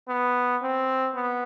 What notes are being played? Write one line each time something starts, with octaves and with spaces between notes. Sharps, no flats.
B3
C4
B3